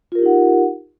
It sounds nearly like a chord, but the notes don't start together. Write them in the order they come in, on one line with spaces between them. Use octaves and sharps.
F4 A#4 G4 D#4 F#5